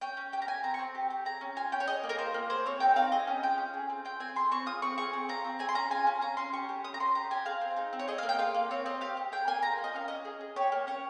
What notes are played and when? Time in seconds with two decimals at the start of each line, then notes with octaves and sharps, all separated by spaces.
0.01 C#4 G5
0.17 C#4
0.33 G4 G5
0.42 A#5
0.48 G4 G#5
0.63 C4 A#5
0.74 C#6
0.79 C4
0.95 G4
1.10 G4
1.25 G#4 A#5
1.41 C#4
1.56 F4 G#5
1.72 C#4 G5
1.80 C#5
1.87 G#4 D#5
2.03 A#3
2.09 A#4
2.18 F4 C5
2.34 A#3
2.50 G#4 C5
2.65 C4 C#5
2.80 D#4 G5
2.96 C4 F5
3.12 G#4 D#5
3.27 C#4
3.43 F4 G5
3.58 C#4
3.74 G#4
3.90 C4
4.05 F4 G5
4.20 C4 G#5
4.36 G#4 C6
4.51 C4 C#6
4.66 F4 D#6
4.82 C4 C#6
4.98 G#4 C#6
5.13 C4
5.29 F4 A#5
5.45 C4
5.59 G#4 G#5
5.69 C6
5.75 C#4 A#5
5.91 F4 G#5
6.07 C#4
6.21 C#4 A#5
6.37 C#4 C6
6.53 G4 C#6
6.69 G4
6.84 C#4 D#6
6.94 A#5
7.00 C#4 C6
7.15 G4 A#5
7.31 G4 G#5
7.45 G#4 F5
7.62 C4
7.76 D#4
7.93 C4
7.99 C#5
8.08 G#4 D#5
8.18 F5
8.23 A#3
8.29 G5
8.39 F4 F5
8.54 A#3
8.71 C4 C#5
8.86 C4 D#5
9.01 G4 F5
9.17 G4
9.32 G#4 G5
9.47 A#3 G#5
9.63 F4 A#5
9.78 A#3
9.84 D#5
9.94 C#4 F5
10.08 C#4 D#5
10.25 G#4
10.41 G#4
10.56 G4 C#5
10.72 A#3
10.87 C#4 C#5